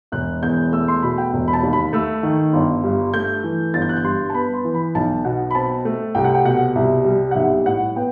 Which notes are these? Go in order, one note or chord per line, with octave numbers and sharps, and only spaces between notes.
E1 F#6
E2 G6
A3 E6
C6
B2 B5
G5
E1
B5
A5
D#2
B5
A3 E6
D#3
G1
G2
A3 G6
E3
G1 A6
G6
F#6
G6
G2 C6
A5
B3 B5
C6
E3
B5
B1 A5
B2 F#5
B5
C4 A5
A3
C2 G5
F#5
G5
B2 F#5
C2 E5
G3
F#5
B1 E5
A2 F#5
B3 G5